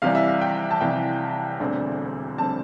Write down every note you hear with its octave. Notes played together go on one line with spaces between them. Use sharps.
C2 C3 E3 G3 F5
E5
F5
G5
A5
C2 C3 E3 G3 G5
E1 D2 D3 G3 C4
D3 G3 C4 A5